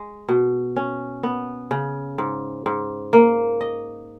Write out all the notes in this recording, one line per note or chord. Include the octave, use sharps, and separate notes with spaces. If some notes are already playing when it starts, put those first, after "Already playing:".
Already playing: G#3
B2
C#4
B3
C#3
G#2
G#2
A#3
D#5